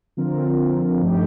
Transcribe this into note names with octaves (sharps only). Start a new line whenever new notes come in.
D3 F3 C4 F4 A#4
G2 F3 A3 D#4 G4